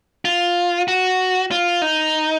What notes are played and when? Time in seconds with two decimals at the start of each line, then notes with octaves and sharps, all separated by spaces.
0.25 F4
0.88 F#4
1.51 F4
1.82 D#4